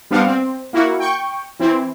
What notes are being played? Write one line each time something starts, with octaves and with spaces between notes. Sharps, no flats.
G3 B3 C4 D4 F5 F#5
C4
A#3 E4 F#4
G5 C#6 G6
E3 C4 E4